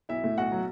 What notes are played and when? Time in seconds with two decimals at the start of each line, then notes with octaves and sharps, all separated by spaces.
0.09 B1 E4 E5
0.24 A2
0.38 B1 F#4 F#5
0.52 F#3